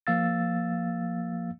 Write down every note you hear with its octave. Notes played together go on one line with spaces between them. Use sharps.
F3 A#3 F5 E6 A6